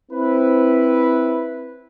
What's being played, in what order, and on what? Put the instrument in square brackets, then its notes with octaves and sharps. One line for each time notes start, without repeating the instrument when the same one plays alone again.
[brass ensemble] C4 E4 B4